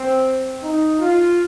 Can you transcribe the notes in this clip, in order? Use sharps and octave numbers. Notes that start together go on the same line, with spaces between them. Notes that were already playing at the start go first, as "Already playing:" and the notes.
Already playing: C4
D#4
F4